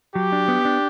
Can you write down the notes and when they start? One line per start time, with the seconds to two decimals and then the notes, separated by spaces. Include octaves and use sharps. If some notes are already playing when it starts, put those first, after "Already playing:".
0.15 F#3 G4
0.32 D4
0.48 B3
0.65 D4